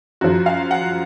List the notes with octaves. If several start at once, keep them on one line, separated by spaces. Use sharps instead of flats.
F#2 F3 F#4
F5
F#5